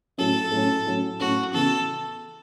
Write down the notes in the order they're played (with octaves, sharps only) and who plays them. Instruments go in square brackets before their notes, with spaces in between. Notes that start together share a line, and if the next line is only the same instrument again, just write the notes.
[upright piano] A2 F#3 C#4 [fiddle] A4
[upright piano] A2 F#3 C#4
A2 F#3 C#4
[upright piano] A2 F#3 C#4 [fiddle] F#4
[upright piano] C#3 E3 B3 F#4 [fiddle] A4